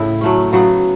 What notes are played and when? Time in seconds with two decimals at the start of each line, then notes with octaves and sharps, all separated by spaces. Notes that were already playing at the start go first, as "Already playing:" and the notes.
Already playing: A2 C#3 E4
0.21 F#3 A3 C#4
0.53 C#3 F#3 B3